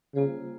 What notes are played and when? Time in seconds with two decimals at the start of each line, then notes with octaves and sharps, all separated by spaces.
0.15 C#3 G3 A#3 F4 G#4 C5